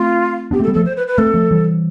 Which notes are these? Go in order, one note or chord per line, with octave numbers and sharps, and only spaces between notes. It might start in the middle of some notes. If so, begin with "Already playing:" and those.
Already playing: A3 C4 F4
B3 D4 G4
A3 C4 A4
G3 B3
A4
F3 A3
C5
B4
B4
A3 C4 A4
F3 A3
E3 G3